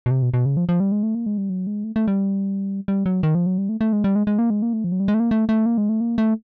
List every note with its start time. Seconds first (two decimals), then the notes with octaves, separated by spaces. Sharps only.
0.06 B2
0.11 C3
0.22 B2
0.34 B2
0.46 C#3
0.57 F3
0.69 F3
0.80 G3
0.92 G#3
1.03 A3
1.15 A#3
1.26 G#3
1.38 G3
1.50 F#3
1.67 G#3
1.84 A3
1.96 A3
2.08 G3
2.88 G3
3.06 F#3
3.23 D#3
3.35 F3
3.46 F#3
3.58 G3
3.69 A3
3.81 A3
3.93 G#3
4.04 G3
4.16 G#3
4.27 G#3
4.39 A#3
4.50 G#3
4.62 A#3
4.73 A3
4.84 F3
4.92 F#3
5.00 G3
5.08 G#3
5.14 A3
5.20 A#3
5.31 A3
5.49 A3
5.66 A#3
5.78 G#3
5.89 A3
6.01 A#3
6.18 A3